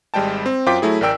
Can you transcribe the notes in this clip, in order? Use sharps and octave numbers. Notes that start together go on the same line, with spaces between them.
G#1 G3 G#3 G5 A5
C4
F#2 F4 C5 G5 D6 B6
F#3 A3 E4 G#4
A1 A#4 D5 G5 E6 D7